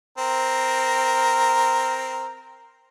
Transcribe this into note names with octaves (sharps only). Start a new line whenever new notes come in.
C4 A#4